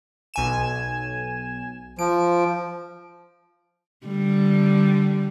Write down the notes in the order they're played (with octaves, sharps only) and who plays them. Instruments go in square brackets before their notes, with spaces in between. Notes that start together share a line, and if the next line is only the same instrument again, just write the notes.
[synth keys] B1 G#5 E7
[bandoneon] F3 [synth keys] D7
[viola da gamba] D3 G3